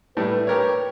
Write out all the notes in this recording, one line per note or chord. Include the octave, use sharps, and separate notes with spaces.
A2 G3 A3 B4
G4 A#4 C#5